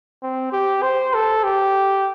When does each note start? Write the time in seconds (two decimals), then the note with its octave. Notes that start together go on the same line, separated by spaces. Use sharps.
0.22 C4
0.53 G4
0.83 C5
1.14 A4
1.44 G4